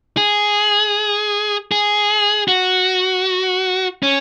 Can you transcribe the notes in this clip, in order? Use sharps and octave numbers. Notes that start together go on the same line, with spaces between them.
G#4
G#4
F#4
C#4